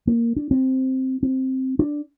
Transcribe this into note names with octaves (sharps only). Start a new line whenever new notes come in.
A#3
D4
C4
C4
D4